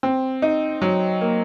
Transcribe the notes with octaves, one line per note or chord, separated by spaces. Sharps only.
C4
D#4
F#3
A#3